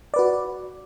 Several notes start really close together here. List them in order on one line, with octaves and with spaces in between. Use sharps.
D5 B4 F#4